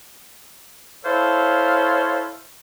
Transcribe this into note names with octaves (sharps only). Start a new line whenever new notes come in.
E4 A4 C5 C#5 F5